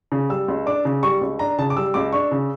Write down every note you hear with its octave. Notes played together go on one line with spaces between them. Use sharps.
C#3
G3 E6
C#2
D4 D6
C#3
G3 C#6
C#2
D4 A#5
C#3 A5
D6
G3 E6
C#2 D6
D4 C#6
C#3